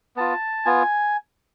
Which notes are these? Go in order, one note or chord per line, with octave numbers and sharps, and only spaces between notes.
B3 F4 A5
B3 F4 G#5